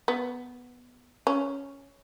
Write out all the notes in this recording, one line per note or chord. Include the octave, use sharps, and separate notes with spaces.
B3
C#4